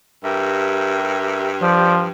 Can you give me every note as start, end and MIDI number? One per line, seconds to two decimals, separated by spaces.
0.24 2.12 43
0.24 1.49 67
0.24 1.49 70
0.24 1.49 76
1.61 2.07 53
1.61 1.94 67
1.61 1.94 72
1.61 1.94 74